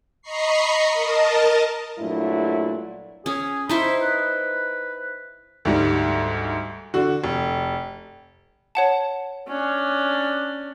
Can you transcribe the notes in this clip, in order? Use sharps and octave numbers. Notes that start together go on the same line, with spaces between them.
D#5 A#5 B5 C#6 C7
A#4 D#5 A5
G2 A#2 F#3 A3 D4 E4
C#4 G#4
D#4 E4 C5 B5
B4
D2 G#2 G3
D3 F#4
F1
C#5 F#5 A5
C#4 D4